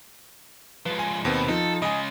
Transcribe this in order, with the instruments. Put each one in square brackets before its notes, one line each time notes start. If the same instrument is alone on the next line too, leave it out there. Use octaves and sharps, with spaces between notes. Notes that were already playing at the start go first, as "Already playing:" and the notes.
[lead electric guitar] F3 G#3 [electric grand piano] B4
[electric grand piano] G#5
[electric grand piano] D#2 B3 C4 [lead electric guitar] B2
[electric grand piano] F3 D#4 [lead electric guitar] A4
[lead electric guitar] C#3 G#3 [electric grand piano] D#5 G#5